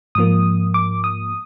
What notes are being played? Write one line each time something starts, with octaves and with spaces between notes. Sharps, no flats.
G#2 F3 A#3 D#6
D6
D#6